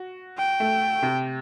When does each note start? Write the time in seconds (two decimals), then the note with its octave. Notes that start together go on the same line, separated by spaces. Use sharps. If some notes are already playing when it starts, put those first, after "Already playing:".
Already playing: F#4
0.38 G5
0.60 A3
1.02 C3